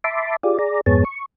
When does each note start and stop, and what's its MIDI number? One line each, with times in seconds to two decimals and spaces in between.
0.04 0.36 76
0.04 0.36 81
0.04 0.36 83
0.04 0.36 84
0.04 0.36 86
0.43 0.58 65
0.43 0.58 67
0.43 0.58 68
0.43 0.58 74
0.59 0.81 68
0.59 0.81 74
0.59 0.81 82
0.86 1.04 41
0.86 1.04 44
0.86 1.04 59
0.86 1.04 68
0.86 1.04 73
0.86 1.04 81
1.05 1.25 85